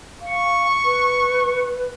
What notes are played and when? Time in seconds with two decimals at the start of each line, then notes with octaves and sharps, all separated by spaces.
0.22 F5 C#6
0.85 B4